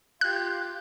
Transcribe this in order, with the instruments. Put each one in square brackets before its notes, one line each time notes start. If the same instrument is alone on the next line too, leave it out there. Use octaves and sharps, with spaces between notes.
[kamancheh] F4 G4 [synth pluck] F#6